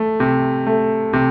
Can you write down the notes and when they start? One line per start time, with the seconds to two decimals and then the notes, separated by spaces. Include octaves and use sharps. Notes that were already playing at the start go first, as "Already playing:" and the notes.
Already playing: A3
0.20 C3
0.67 A3
1.13 C3